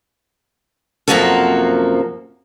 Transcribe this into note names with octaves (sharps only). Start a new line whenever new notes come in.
F#2 C3 F3 A#3 F#4 A4